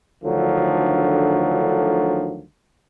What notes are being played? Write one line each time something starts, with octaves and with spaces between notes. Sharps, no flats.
D2 D3 D#3 F3 F#3